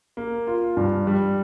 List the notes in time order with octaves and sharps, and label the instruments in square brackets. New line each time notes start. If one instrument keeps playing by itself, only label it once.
[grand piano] A#3
F4
G2
G3